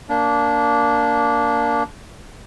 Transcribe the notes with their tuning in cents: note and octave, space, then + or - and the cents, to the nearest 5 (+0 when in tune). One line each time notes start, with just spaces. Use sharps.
A#3 +0 D4 -15